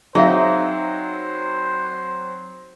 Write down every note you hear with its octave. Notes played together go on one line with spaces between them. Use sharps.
F#3 C4 D#4 G#4 C5 E5 F5